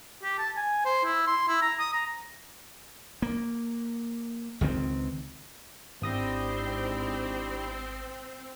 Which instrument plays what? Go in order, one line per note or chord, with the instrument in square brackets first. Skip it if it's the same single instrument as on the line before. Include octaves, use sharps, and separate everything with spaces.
[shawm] G4
A5
G#5
C5
E4
C6
E4
A#5
D#6
A#5
[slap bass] A#3
C#2 D#3 G3 C4
[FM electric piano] G#1 D#6 A#6 [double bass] G#2 [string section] C4 [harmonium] D4 E4 G4